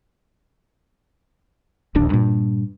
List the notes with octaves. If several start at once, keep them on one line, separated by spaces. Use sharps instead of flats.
D1 A#1 D#2 D4
G2 A#2